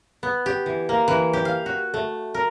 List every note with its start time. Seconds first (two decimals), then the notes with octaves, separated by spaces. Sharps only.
0.23 B3
0.46 G4
0.66 E3
0.89 A#3
1.08 E3
1.33 G4
1.45 F5
1.66 F#4
1.94 A3
2.34 A#4